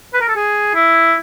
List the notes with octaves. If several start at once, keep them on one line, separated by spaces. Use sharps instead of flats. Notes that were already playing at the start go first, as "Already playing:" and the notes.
B4
A#4
A4
G#4
E4